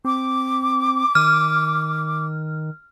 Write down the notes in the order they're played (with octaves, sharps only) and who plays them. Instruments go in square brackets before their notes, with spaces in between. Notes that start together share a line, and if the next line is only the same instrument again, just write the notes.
[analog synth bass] C4 [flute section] D6
[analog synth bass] D#3 [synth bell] F6